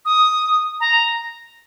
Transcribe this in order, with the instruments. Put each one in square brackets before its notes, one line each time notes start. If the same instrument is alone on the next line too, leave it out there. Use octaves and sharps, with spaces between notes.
[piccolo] D#6
A#5